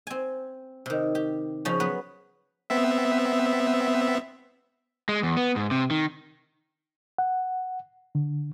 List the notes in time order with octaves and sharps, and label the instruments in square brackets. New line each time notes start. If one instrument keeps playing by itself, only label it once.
[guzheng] C4 G#5
C3 D#3
G4
C#3 F3 C#4
F#3 B3 B4
[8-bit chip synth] B3 C4 E5
[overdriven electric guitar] G#3
E2
B3
G#2
C3
D#3
[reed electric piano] F#5
D3